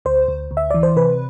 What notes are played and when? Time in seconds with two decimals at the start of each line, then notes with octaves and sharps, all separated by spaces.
0.05 D2 C5
0.28 D2
0.51 D2
0.57 E5
0.70 E3 D5
0.83 C5
0.96 C3 B4